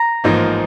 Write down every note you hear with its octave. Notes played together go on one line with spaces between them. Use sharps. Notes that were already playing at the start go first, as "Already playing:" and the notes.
Already playing: A#5
A1 G#2 F3 A#3 D#4